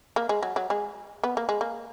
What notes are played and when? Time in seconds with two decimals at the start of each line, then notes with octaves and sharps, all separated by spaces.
0.16 A#3
0.29 G#3
0.43 F#3
0.56 F#3
0.70 G#3
1.24 B3
1.37 A#3
1.49 G#3
1.61 A#3